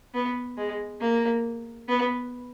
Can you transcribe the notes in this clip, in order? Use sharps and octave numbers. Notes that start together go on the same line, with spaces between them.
B3
G#3
A#3
B3